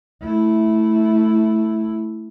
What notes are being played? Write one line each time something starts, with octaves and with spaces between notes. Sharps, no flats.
A3 E4